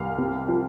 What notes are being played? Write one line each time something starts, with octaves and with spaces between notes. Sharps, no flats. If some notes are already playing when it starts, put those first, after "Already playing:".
Already playing: C2 F5
C3
F3